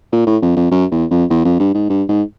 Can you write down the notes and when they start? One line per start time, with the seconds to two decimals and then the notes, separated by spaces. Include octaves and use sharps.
0.12 A#2
0.27 A2
0.42 F2
0.56 F2
0.71 F#2
0.91 E2
1.11 F2
1.30 E2
1.45 F2
1.60 G2
1.74 G#2
1.89 G2
2.09 G#2